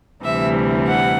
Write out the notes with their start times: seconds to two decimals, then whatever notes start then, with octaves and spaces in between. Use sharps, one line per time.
0.24 D2 C3 E3 G3 E5
0.87 F#5